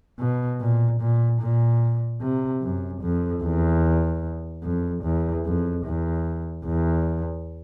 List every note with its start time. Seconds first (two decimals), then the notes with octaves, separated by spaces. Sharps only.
0.19 B2
0.61 A#2
1.01 A#2
1.41 A#2
2.22 C3
2.63 F#2
3.02 F2
3.43 E2
4.64 F2
5.04 E2
5.46 F2
5.86 E2
6.66 E2